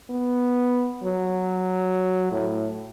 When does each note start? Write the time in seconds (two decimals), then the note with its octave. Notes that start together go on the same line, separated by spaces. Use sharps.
0.10 B3
1.04 F#3
2.31 A2